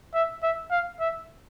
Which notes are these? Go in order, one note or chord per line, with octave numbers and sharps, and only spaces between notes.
E5
E5
F5
E5